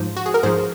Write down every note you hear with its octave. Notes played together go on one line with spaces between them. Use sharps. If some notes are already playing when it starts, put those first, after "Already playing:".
Already playing: G#2 F3 C5
F#4
G#4
A#4
G#2 F3 G#4 C5